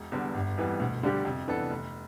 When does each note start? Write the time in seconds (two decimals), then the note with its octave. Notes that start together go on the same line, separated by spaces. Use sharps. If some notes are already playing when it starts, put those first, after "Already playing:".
Already playing: E1
0.12 E2 D3 G3 B3
0.34 G1 G2
0.57 F2 E3 G3 B3
0.80 D2 B2
1.03 D3 G3 D4 G4
1.25 F2 C3
1.48 E3 B3 D4 A4
1.70 F1